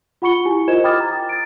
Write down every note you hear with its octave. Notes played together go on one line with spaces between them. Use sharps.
F4 F#5 B5 C#6 C#7 G7
E4 G4 G#5
F4 A#4 C5 D#5 G#6 E7
G5 B5 D6 D#6 F6 A6
A#5 A6
A6 D7